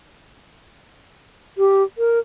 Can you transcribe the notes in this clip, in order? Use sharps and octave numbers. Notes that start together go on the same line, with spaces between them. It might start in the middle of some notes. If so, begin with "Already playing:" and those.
G4
A#4